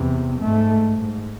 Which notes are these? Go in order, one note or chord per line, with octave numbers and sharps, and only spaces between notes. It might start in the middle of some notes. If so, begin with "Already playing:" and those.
Already playing: E2 C3
G#2 A3
G#2